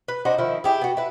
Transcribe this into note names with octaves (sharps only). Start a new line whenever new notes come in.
B4
D4 D#4 F#4 C5
D#3 F3 E4
E4 G4 G#4
B3 F#4
E4 B4